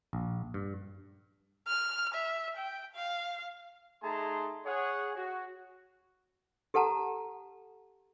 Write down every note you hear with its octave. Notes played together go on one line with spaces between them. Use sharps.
A#1
G2
F6
E5
G5
F5
A3 D#4 G#4 A5 A#5 C6
G#4 C#5 F#5
F#4
G4 A4 F#5 A5 A#5